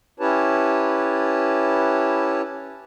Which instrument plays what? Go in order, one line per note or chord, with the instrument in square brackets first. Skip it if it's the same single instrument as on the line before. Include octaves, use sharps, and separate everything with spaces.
[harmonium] C#4 E4 G4 B4 C#5 A5